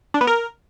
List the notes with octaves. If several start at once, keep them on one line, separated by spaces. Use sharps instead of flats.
D4
B3
A#4